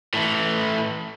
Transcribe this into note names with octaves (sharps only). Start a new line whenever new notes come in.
A2 E3